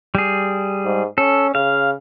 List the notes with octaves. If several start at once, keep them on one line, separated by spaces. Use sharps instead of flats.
G3 G#4
G#2
C#4 A4
C#3 F5